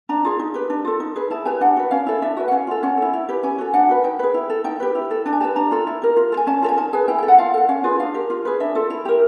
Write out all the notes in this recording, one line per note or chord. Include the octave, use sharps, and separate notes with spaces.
D4 A#5
F4 G#4
D#4
G4 B4
D4
F4 A4
D#4
G#4 B4
E4 A5
G4 B4 G#5
D4 F#5
F#4 B4
C#4 F5
E4 A4
D4 E5
F#4 B4 E5
F#5
C#4 F5
F4 A4
C#4 F#5
E4 A4
E4
G4 B4
C#4 G#5
F#4 A4
D4 F#5
F#4 B4
D#4 G5
G#4 B4
E4
A4
D#4 G5
G4 B4
E4
A4
D4 A5
G#5
G4 B4 A5
D4 A#5
F4 A4
E4
G4 A#4
F4
A4
G#5
C#4 A5
F4 A4
G#5
D#4 A5
G#4 B4 G#5
E4 G5
G5
A4
F#5
F4 F5
A4 F#5
C#4 F5
F4 G#4 B4
D4 F5
G4 A#4
F4
G#4 B4
D4 E5
F4 A4
E4
G4 A#4